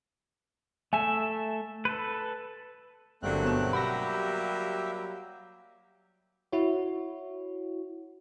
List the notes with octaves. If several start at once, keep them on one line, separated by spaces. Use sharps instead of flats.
A3 E5 G#5
A4 B4
G1 D3 F#3 G3 A3 A#3 C4 F#6
B2 C#5 E7
G4 E5 F#5 B5 D6 A#6
E4 F#4 C#5